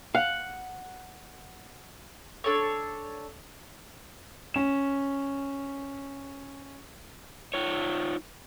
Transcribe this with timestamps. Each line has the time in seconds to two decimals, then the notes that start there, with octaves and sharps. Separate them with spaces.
0.15 F5 F#5
2.44 D4 A4 C#5
4.54 C#4 E7
7.54 D#4 F4 C#5